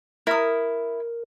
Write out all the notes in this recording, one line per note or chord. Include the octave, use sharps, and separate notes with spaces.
E4 A#4 D#6